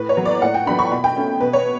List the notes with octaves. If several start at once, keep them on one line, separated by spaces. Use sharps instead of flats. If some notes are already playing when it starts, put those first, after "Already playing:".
Already playing: A2 B4
C#5
F#3 B3
D5
A2 F#5
G5
F#3 B3 D4 B5
C#6
B2 B5
G5
A3 C#4
B2 B4
C#5